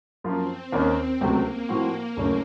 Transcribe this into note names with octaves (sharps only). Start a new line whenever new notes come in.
F#2 F3 A#3 C4 F4
D#2 D#3 A#3 C#4
C#2 C3 F#3 A3 A#3
A2 F3 C4 F#4
F#1 F#2 C#3 A3 C#4